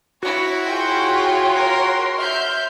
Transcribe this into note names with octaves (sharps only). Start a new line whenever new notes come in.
E4 F#4 C#5 C#6
F4 G#4 C#5 G5 C6
A#4
E5 F6 G6